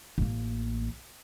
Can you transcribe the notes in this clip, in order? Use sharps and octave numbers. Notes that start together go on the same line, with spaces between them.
A1 A#3